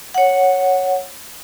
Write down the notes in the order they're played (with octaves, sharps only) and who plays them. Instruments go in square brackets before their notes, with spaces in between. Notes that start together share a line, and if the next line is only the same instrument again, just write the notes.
[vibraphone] C#5 F#5